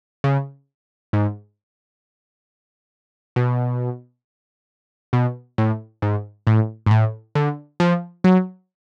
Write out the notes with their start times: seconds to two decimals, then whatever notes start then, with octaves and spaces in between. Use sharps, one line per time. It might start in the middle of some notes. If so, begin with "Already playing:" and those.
0.24 C#3
1.13 G#2
3.36 B2
5.13 B2
5.58 A2
6.02 G#2
6.47 A2
6.86 G#2
6.91 A2
7.35 D3
7.80 F3
8.24 F#3